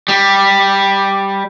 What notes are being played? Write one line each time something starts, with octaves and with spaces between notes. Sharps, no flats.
G3